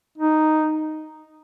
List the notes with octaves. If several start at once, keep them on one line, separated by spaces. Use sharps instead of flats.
D#4